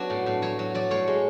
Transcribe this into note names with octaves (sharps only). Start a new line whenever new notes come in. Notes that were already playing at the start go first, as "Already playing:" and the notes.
Already playing: F#3 B3 D4 F#4
A2
A2
F#3 C#5
F#3
F#3 D5
A2 C#5
G#3